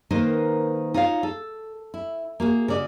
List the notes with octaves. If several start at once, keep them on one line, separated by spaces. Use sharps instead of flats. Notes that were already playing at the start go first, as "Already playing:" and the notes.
D#3 A#3 D#4 B4 C5 D#5
D#4 F4 F#4 C#5 F5
A4
E4
A#3 F#4 G#4
C#3 F#4 D5 D#5